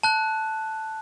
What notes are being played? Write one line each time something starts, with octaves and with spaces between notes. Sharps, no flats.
A5 F#6